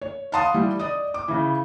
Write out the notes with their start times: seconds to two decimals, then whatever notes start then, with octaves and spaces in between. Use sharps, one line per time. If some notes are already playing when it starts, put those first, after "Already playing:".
0.01 C#5
0.32 F5 F#5 A5 C6 D#6
0.54 E3 G3
0.79 D5 D#5 D#6
1.14 D6
1.28 C#3 E3